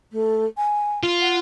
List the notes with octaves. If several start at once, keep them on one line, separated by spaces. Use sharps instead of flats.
A3
G#5
F4
F#5